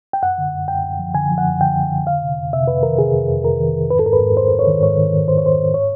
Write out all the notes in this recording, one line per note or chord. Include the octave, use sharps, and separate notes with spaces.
G5
F#2 F#5
D3
F#2
F#2 G5
F#2
F3
D3 G#5
F3
F#5
F#2
D3 G5
F#2
D3
F2 F5
C3
F2
C3 E5
F2 B4
D#3 A#4
C3 G#4
F2
F2
F2 A#4
D#3
F2
G#2 B4
A4
G#2 A#4
B4
G#2
G#2 C5
G#2
C#5
D#3
G#2 C#5
D#3
D#3
D#3 C5
C#5
G#2 C5
G#2
C#5